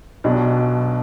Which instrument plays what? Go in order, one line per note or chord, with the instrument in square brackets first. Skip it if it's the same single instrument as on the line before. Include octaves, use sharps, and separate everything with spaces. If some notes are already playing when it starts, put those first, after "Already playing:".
[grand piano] B1 B2 F#3 D4